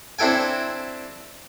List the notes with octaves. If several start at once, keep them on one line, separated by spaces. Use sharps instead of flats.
C4 D4 E4 A4 G5 G#5